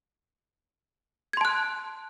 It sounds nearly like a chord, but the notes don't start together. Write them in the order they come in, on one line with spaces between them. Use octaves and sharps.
G#6 C6 A5 F#6